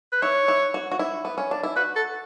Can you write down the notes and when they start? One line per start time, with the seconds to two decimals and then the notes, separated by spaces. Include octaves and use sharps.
0.12 B4
0.22 E4 C#5
0.48 E4
0.74 F#4
0.92 F#4
0.99 E4
1.25 B3
1.38 C#4
1.51 D4
1.63 E4
1.76 F#4 B4
1.96 A4